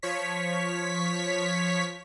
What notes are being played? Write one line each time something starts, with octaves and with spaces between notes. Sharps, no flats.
F3 C#5 B6